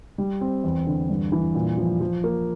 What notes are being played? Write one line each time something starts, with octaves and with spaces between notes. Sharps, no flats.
G3
C4
E2
D3
G2
E3
A#2
F3
F3
A#3